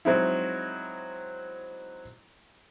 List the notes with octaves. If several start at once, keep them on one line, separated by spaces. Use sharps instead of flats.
F#3 G#3 C4 D#4 E4